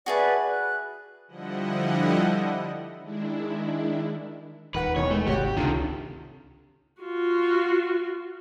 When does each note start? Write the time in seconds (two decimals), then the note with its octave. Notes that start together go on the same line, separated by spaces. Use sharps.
0.06 F#4 G#4 B4 D5 E5 A5
0.48 F#6
1.28 D3 F3 G3 E4 D#5 F#5
3.01 D#3 G#3 D4 E4
4.75 D#1 D#3 B4 F#5
4.96 B2 D#3 E3 C#5
5.10 G#3 A3
5.27 G#1 C3 F#4 G4 C#5 F#5
5.57 C#2 C3 D#3 D4 F4 A4
7.02 F4 F#4